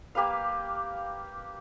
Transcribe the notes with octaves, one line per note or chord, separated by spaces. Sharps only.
A#3 G4 B4 F5